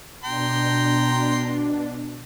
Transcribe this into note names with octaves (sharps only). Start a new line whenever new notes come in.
B2 D4 G5 A#5 C6